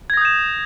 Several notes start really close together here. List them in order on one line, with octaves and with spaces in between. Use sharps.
G#6 A#6 D#6 G6 E7